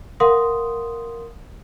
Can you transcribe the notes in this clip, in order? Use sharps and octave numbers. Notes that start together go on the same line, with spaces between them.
A#4 F5 F#5 C6 D#6